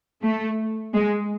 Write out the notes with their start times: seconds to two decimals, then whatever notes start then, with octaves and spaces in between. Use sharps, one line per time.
0.22 A3
0.93 G#3